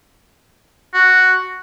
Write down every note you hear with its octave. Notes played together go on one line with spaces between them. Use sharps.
F#4